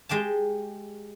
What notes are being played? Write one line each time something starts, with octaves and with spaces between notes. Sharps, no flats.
G#3 G4 G5 A5